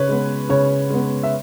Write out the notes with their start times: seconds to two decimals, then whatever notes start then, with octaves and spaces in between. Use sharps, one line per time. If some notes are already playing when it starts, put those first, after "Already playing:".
Already playing: C#3 B4 C#5
0.09 G#3 B3
0.49 C#3 C#5
0.90 G#3 B3
1.23 E5